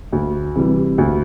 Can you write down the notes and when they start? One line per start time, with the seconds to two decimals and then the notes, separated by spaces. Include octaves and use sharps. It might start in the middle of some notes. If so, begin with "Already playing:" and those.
0.12 D2
0.56 C3 E3 G3
0.98 D2